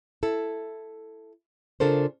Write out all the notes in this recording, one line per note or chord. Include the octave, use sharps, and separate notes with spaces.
E4 A4
C#3 D4 F4 A4 A#4 C5